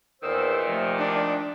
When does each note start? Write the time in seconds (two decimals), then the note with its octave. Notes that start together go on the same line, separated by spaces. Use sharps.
0.23 E2 A#2 D#3 C5 E6
0.67 C3 F3 A3
1.00 D4